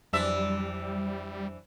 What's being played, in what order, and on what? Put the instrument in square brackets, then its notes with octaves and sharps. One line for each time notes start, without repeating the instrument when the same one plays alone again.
[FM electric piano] F2 F#3 C5 [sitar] E3 D4 E5 [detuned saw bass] G3